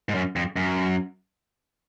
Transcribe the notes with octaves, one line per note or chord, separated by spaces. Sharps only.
G#2
F#2
F2
F#2